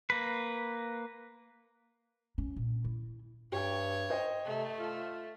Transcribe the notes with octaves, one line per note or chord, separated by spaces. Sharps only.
A#3 B4
C#4
A#2
E4
G2 G4 C#5 G5
C5 D#5 G5
C3 A3
F4